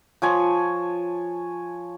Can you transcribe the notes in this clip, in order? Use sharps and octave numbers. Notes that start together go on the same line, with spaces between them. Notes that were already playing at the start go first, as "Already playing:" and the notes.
F3 C#5 G#5